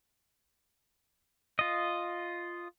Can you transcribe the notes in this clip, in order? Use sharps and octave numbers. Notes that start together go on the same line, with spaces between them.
F4 D#5